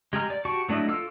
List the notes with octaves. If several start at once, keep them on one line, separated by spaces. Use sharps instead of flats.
G#3 G4 G#4 A#5 F6
D5
F#4 G4 A5 C#6 D6
F#3 A3 D4 E4 D#5
F4 A4 D6 E6 F6